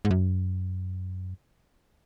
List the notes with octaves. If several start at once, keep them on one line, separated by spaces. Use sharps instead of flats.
G#2
F#2